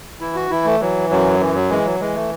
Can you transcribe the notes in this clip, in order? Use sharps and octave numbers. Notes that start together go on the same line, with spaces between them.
E3 E4
F#4
E3 E4
A3
E3 F#3
F#2 F#3
E3
F#3
E3 G#3
F#3
E3 G#3
A3